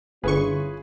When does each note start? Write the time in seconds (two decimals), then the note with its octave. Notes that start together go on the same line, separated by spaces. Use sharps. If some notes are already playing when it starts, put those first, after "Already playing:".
0.24 G1 D3 C#4 E4 F4 G#4 B4 C#6